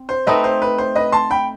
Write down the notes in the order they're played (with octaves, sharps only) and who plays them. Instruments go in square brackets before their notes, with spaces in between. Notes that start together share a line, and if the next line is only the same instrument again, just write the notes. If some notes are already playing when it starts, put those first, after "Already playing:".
Already playing: [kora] C4
[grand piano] C5
[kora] A3 C4 D#4 [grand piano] B4 D#5
[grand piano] C5
B4
C5
B4 D#5
A5 C6
G5 B5